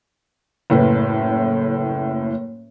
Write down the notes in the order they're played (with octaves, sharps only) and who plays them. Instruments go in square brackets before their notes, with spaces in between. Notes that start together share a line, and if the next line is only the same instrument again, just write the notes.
[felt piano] F#1 A2 B4